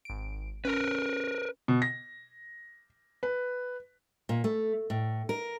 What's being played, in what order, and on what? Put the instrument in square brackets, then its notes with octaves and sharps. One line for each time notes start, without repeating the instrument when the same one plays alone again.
[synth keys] G#1 D7
[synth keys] C#4 [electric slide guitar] A#4 B4
[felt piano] B2
A#6
B4
[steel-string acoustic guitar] A#2
A3
A2
A#4